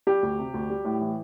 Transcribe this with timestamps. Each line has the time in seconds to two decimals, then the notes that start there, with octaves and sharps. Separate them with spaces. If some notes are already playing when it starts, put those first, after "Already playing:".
0.07 G3 G4
0.23 D2
0.39 C3
0.54 D2
0.70 G3
0.85 A2
1.01 E3